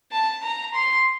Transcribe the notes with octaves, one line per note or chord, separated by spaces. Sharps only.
A5
A#5
C6